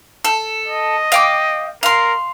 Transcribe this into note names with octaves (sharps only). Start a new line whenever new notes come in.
A4
D#5
F5 G5 D6
A#4 F5 C6